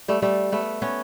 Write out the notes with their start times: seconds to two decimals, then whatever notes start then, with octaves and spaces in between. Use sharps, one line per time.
0.08 G3 A3
0.22 G3 A3
0.52 A3 B3
0.82 B3 C#4